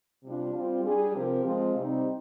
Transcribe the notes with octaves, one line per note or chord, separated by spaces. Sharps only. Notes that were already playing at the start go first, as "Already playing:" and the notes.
C3 G3 D4 F4
G3 C4 F4
G3 D4 G#4
C3 F3 C4 G4 A#4
F3 G#3 C4 F4
C3 G3 C4 D#4